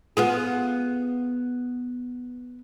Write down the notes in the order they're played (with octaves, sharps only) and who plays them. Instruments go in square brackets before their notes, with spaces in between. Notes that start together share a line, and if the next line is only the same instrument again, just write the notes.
[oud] B3 F4 G#4